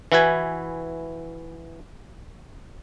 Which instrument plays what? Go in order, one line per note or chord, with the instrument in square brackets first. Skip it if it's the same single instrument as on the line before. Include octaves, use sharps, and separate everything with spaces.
[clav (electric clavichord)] E3 E4 F#4 B4 G#5